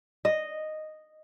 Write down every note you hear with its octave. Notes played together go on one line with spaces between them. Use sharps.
D#5